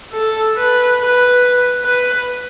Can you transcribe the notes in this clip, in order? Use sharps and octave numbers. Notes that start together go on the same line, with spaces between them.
A4
B4
B4
B4